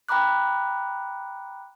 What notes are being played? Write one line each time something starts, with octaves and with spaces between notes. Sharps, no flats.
G5 A#5 B5 D6 F#6